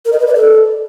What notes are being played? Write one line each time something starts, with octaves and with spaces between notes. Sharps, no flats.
A#4
D#5
B4
D5
A4